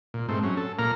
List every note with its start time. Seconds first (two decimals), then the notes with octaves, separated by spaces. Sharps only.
0.14 A#2
0.29 G#2 A3 C4
0.44 F#3 C#4
0.57 A4
0.79 A#2 A#3 A#5 F6